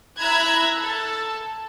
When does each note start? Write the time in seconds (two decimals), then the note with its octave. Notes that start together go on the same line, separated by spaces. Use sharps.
0.20 E4 A#5 B5 E6 F#6 G#6
0.79 A4 A5